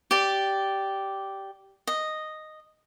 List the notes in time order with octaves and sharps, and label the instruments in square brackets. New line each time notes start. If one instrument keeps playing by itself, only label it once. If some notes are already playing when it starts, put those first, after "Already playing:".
[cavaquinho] G4 D5
D#5